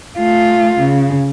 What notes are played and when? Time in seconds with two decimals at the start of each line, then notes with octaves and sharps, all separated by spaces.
0.18 A3 F4
0.79 C#3